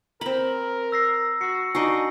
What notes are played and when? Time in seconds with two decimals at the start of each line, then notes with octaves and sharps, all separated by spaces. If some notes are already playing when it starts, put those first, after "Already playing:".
0.21 C4 A#4 A#5 B5
0.92 E6 A#6 C7
1.41 F#4 C7 C#7
1.75 D4 D#4 F#4 G#5 C7 D7